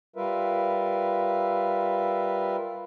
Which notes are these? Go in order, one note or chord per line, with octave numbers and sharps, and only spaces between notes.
G3 F4 A#4 B4 E5